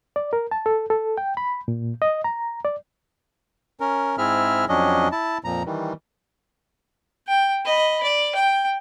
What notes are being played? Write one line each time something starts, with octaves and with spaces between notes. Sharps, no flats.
D5
A#4
A5
A4
A4
G5
B5
A#2
D#5
A#5
D5
C#4 A#4
G#2 C4 E4 G#4 E5 F6
F2 F#3 C#4 D4 D#5
E4 A5
F2 A#2 F3 A#5
D#3 E3 G3
G5
D#5 B5
D5
G5